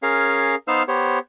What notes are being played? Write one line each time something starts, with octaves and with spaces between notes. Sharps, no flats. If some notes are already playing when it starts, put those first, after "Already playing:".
C#4 G#4 A#4 F5
B3 D#4 C5 F5 E6 F6
B3 G4 C5 C#5